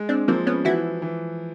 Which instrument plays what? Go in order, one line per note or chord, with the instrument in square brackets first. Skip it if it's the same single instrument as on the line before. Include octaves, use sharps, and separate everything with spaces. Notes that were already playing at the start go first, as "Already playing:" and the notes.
Already playing: [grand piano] G#3
[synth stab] C4 D4
[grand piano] F3 [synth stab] A#3 C4
[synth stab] B3 C#4
[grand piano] E3 [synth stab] E4 F#4
[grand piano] E3